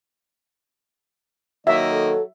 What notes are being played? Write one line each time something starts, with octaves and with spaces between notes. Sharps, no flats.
D#3 F#3 A#3 D#5 E5
A4